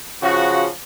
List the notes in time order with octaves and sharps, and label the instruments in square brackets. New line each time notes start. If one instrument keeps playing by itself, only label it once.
[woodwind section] C#3 F3 [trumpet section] F#4